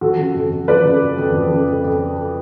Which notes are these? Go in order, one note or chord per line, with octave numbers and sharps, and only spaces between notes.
F3 F#4 A4
C#3
F2
F2
F3 B4 D5
C#3
F2
F2
F3
C#3
F2
F2